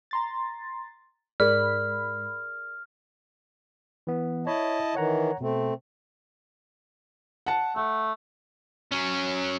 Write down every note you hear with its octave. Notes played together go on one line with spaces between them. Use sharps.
A#5 C6 A6
G#2 G#4 A#4 D5 B5 F6
E3 B3
E4 C#5 D#5 A5 B5
D#3 E3 C#5 F#5 A#5
B2 A3 C4
F#5 A5
A3 F#5
F#3 C#4